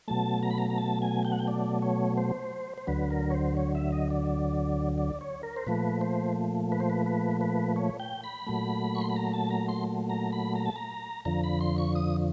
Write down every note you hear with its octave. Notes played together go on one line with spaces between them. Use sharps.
B2 F#3 A3 A5
A#5
B5
A#5
A#5
A5
G#5
G5
F#5
G5
D5
C#5
C5
C5
D2 D3 F#3 B4
A#4
C#5
C5
C#5
E5
D#5
D5
D5
C#5
A#4
C5
A#2 F3 A3 B4
C5
B4
C5
B4
B4
B4
C#5
G5
B5
A#2 F#3 A3
C#6
C6
B5
A#5
A5
A#5
C6
A#5
B5
A#5
A5
A#5
F2 D3 F3 A#5
B5
C6
C#6
D#6